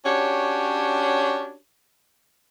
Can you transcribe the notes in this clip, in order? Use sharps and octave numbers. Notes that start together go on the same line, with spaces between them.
C#4 D4 F#4 G4 C#5